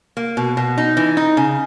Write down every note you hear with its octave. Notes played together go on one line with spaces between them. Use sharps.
A#3
B2
B2
D#4
E3
D#4
C#3